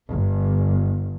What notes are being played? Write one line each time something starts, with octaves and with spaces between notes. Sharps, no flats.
G1